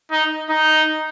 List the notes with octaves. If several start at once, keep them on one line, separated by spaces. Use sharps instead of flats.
D#4
D#4